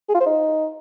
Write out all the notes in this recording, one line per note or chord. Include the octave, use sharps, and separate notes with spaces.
G#4
F4
C5
D#4